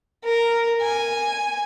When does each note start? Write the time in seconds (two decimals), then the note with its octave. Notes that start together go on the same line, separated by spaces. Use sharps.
0.25 A#4
0.81 G#5